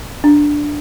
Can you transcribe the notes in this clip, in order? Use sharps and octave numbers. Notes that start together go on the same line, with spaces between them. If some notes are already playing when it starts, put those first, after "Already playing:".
D4